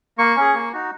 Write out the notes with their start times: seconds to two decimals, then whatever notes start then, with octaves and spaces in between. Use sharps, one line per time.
0.18 A#3 C#6
0.36 C#4 G#4
0.54 A#3
0.73 D#4 F#4